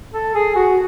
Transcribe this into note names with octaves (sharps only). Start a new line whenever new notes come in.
A4
G#4
F#4